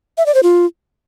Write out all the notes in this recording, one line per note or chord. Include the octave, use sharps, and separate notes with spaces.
E5
D5
C5
F4